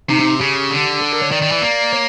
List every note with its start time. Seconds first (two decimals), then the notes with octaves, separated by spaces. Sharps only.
0.09 C3 D#4
0.20 D#4
0.40 C#3 G4
0.71 D3
1.01 A4
1.11 A#4
1.22 C#5
1.31 D#3 D5
1.42 D#3
1.52 E3
1.62 A#3
1.93 C#5